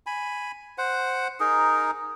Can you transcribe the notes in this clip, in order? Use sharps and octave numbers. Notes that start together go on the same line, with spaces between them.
G#5 B5
C5 F#5
D#4 G#4 A#4